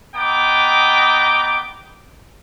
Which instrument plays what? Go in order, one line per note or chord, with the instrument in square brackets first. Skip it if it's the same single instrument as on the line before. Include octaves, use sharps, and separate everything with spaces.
[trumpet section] B3 D#5 G5 A#5 D6